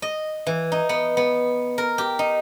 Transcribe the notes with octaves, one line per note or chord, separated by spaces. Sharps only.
D#5
E3
D#4
B3
B3
A#4
G4
D#4